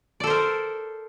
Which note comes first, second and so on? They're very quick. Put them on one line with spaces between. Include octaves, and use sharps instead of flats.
D5 A4 C5 A#4